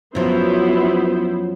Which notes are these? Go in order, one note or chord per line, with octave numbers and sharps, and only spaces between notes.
F#2 F3 F#3 B3 E4 C5